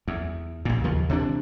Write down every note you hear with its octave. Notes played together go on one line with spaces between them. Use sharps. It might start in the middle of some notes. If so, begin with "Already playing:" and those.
E2
A#1 A#2
D#2 C#3 F3
C3 E3 D4